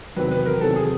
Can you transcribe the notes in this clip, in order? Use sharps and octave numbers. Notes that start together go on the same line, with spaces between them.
E2 C3 D#3 F#3 B4
B4
A#4
E2 C3 D#3 F#3 A4
G#4